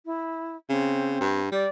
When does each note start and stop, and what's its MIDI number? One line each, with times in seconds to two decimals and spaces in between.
0.06 0.56 64
0.70 1.20 49
0.70 1.40 60
1.21 1.51 43
1.52 1.66 55
1.52 1.69 74